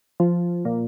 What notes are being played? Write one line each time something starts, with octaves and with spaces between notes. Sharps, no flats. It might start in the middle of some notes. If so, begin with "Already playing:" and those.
F3
A#2